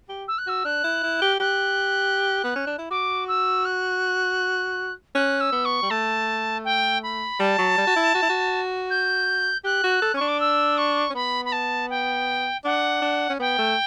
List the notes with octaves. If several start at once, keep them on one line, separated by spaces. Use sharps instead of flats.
G4
E6
F#6
F#4 E6
D4 F#6
E4
E4
G4
G4 F#6
B3
C#4
D4
E4
F#4 D6
E6
F#6
C#4 F#6
E6
B3
C#6
G3
A3 A5
G5
B5
G3 A5
F#3
G3
F#4
E4
F#4
E4
F#4
G6
G4 F#6
F#4
A4
C#4 C#6
D4
D6
E6
C#6
C#4
B3 B5
B5
A5
G5
D4 F#5
D4
C#4
B3 G5
A3